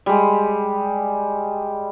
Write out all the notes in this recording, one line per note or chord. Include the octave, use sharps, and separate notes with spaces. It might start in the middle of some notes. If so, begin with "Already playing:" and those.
G3 G#3